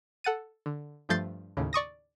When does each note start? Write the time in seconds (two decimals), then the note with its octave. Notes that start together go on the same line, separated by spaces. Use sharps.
0.24 A4 F#5 A6 D#7
0.66 D3
1.09 G2 F3 A3 G6 A6 C7
1.57 D#2 A2 C#3
1.73 D5 C#6 D#6 A#6